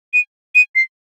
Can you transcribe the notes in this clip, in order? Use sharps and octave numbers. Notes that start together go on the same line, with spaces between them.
D#7
D#7
C7